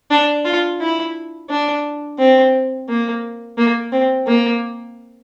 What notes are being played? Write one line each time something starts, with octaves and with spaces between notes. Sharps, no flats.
D4
F4
E4
D4
C4
A#3
A#3
C4
A#3